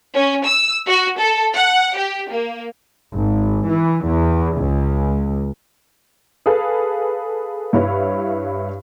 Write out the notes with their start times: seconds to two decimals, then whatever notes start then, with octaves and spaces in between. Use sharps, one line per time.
0.14 C#4
0.46 E6
0.87 F#4
1.19 A4
1.54 F#5
1.97 G4
2.30 A#3
3.13 G#1
3.69 E3
4.06 E2
4.57 C#2
6.46 G#4 A4 B4 F5
7.73 G2 E4 B4 C#5 F5